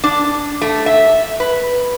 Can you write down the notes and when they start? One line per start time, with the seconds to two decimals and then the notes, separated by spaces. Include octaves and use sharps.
0.04 D4
0.62 A3
0.86 E5
1.40 B4